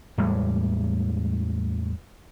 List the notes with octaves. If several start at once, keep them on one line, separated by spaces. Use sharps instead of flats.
E2 A2 G3 G#3